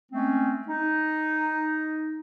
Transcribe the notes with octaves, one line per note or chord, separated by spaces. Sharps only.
G#3 A3 C4 C#4
D#4